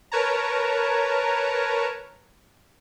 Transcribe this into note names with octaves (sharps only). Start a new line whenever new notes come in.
A#4 B4 C#5 A5 A#5